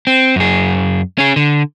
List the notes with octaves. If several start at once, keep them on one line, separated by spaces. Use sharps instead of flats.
C4
F#2 G#4
C#4 G#4
D3